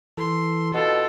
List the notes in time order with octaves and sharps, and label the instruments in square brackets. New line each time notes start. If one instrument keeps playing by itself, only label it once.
[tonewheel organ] E3 A4 [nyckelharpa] C6
[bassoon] B2 [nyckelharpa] E4 F4 [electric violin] A4